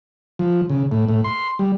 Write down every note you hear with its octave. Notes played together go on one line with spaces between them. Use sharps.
F3
C#3
A2
A2
C6
G3